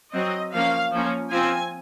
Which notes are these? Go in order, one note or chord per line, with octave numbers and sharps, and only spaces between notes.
F#3 C4 D#5
F3 A#3 C#4 F5
F3 A#3 C#4
F3 C4 G#5